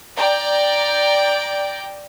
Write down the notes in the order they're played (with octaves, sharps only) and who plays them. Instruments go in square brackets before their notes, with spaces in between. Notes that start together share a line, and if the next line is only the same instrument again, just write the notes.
[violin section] D5 G5 A#5